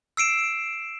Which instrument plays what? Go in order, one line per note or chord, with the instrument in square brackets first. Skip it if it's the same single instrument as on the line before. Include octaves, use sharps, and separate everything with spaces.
[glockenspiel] E6 C7 D7 E7